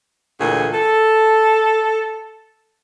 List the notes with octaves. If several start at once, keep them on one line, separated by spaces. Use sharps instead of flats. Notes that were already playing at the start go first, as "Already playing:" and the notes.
D2 A#2 E3 A3 G#4
A4